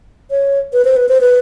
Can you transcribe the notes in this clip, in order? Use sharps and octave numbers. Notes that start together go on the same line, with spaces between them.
C#5
B4
C5
B4
C5
B4